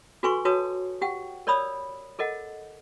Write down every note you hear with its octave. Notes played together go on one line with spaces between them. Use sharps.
F#4 A4 B4 G#5 C6 C#6
F#4 B4 C#5 A5 D#6
G4 F#5 G5
A#4 C#5 D5 B5 D#6 E6
A4 A#4 D#5 F#5